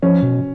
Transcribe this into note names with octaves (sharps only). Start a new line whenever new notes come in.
F3 C#4
B2